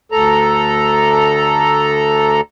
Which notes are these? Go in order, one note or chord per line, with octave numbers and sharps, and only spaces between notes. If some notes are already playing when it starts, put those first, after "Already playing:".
D2 A4 A#5